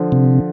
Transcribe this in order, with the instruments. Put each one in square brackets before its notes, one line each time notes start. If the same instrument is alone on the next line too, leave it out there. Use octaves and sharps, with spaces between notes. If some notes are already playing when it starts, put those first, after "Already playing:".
Already playing: [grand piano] D3 F3
[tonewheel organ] C3